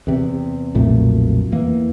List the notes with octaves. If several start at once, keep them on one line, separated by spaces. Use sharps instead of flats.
E2 C3
B1 F2 A#2 A3
E2 E3 A#3